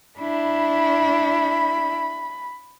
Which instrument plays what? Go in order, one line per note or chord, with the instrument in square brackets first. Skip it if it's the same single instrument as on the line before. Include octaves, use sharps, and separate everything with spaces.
[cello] D4 E4 [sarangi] B5